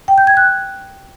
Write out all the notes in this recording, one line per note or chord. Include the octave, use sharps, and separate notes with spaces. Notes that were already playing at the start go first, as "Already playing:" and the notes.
G5
G6
G#6
F#6